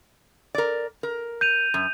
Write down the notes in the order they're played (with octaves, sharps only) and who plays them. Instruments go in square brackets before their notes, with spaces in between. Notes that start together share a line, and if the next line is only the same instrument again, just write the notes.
[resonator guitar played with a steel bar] A#4 D5
A#4
[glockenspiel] G6 D#7 F7
[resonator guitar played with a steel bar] F#2